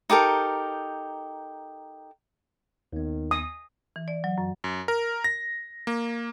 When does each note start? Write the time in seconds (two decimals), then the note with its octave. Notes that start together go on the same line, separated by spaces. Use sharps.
0.10 D#4 G4 A4 A#4
2.93 D#2 D#3 B3
3.31 D#6
3.96 E3
4.08 D5
4.24 F#3
4.38 F#2
4.64 F#2
4.88 A#4
5.24 A#6
5.87 A#3